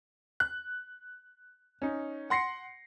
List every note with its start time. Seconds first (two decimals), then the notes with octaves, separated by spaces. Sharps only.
0.40 F#6
1.82 C#4 D#4
2.30 F#5 C6 A#6 C7 C#7